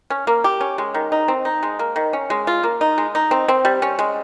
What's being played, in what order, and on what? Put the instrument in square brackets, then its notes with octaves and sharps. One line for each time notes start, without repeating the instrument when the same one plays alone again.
[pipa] C#4
A#3
G4
C#4
G#3
D#3
D#4
C4
D#4
G#3
A#3
D#3
C#4
G#3
F4
A#3
D#4
G#3
D#4
C4
C4
G3
C#4
G#3